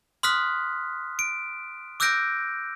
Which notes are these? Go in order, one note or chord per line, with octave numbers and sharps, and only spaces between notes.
C6 D#6 F6 F#6 B6
D7
D6 E6 F#6 G6 A#6 D7